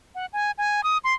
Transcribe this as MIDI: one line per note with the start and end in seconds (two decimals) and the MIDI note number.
0.15 0.26 78
0.33 0.51 80
0.58 0.84 80
0.84 0.98 87
1.04 1.14 84